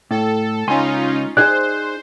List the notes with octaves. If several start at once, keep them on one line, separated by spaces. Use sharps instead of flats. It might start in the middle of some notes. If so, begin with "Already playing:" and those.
A2 A4
C#2 C#4 D#4 F4 G#5 C6
D#4 G#4 C5 D5 F#6